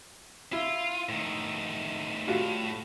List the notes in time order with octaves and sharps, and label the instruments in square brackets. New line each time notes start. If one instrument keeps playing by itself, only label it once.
[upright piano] E4 [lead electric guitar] F4
[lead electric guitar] A2 D#3
[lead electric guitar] A2 [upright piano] G3 F4 F#4